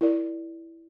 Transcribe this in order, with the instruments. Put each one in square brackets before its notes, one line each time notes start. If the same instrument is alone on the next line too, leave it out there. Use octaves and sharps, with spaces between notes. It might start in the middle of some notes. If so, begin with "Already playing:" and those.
[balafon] E4 A#4 D5